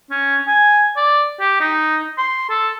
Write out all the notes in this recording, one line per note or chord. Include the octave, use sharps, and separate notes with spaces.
C#4
G#5
D5
G4
D#4
C6
A4